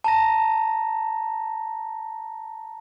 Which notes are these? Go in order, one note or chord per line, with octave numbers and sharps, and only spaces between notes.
A5 A#5 A#6